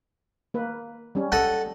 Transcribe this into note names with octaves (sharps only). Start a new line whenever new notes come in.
A#3 B4
G3 C#4
A4 D#5 F#5